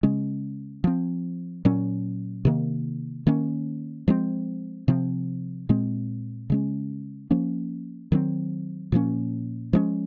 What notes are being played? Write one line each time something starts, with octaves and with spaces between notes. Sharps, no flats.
C#3 G#3 C#4
F3 C4
A#2 F#3 C#4
C3 D#3 A#3
D#3 A#3 C#4
F3 G#3 C4
C3 F3 C4
A#2 G#3 C4
C#3 G#3 C#4
F3 A#3 C#4
D#3 F#3 C4
A#2 F3 A#3 C#4
F3 G#3 C#4